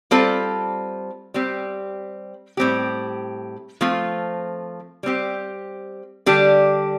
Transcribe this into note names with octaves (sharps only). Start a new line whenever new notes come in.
G3 C4 F4 A4
G3 C4 G4
A2 G3 C4 G4
F3 A3 C4 F4
G3 C4 G4
D3 G3 D4 G4